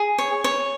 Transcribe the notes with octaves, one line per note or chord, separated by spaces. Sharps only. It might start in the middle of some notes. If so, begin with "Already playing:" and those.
Already playing: G#4
C#5
C#5